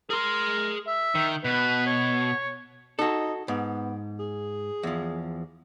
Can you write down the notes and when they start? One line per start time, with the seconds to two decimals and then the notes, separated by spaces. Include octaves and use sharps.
0.10 G#4 A#4 C6
0.87 E5
1.15 D#3
1.44 B2 B4
1.86 C#5
2.99 D#4 F#4 A4
3.48 G#2 B3
4.20 G#4
4.83 E2 F3